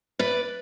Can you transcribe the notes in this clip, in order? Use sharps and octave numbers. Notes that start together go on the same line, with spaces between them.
B4 D5